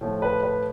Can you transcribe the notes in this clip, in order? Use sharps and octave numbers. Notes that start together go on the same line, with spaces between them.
A2 F3 A3
B4
B4